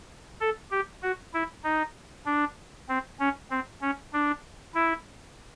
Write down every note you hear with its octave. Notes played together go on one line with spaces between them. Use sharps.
A4
G4
F#4
E4
D#4
D4
C4
C#4
C4
C#4
D4
E4